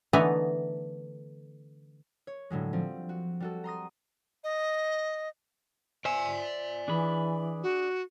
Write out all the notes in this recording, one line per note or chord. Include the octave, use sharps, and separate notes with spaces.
D3 E3 A3 B3 D#4 G#5
C#5
A2 D3 F#3 G#3
F3 G3 C4
F#4
G3 F#4 A4
A#5 C6 D#6 A#6
D#5
C5 D5 E5 G#5
E3 D4 G#4 B5
F#4